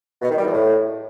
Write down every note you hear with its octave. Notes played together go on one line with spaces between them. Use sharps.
B2
D#3
G3
E2
A2